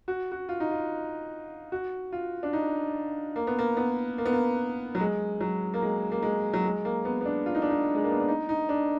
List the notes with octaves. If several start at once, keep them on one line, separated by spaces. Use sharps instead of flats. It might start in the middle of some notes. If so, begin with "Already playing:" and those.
F#4
F#4
F4
D#4
F4
F#4
F4
D4
D#4
A#3
B3
A#3
B3
A#3
B3
A#3
F#3
G#3
F#3
A#3
G#3
A#3
G#3
F#3
G#3
A#3
B3
B3
D4
F4
D#4
D4
D#4
G#3
A#3
B3
D4
D#4
D#4
D4